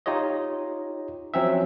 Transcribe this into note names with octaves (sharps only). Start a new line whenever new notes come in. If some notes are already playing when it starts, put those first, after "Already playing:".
D#4 F4 G4 C#5 D#5
F3 F#3 C4 C#4 E5